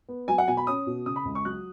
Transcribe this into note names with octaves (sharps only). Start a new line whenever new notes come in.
B3
F#3 G#5
F#5
B2 G#5
B5
C#4 D#6
B2
C#3 D#6
B5
C#2
C#6
F#3 F#6